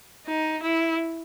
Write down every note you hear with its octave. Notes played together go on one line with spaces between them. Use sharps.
D#4
E4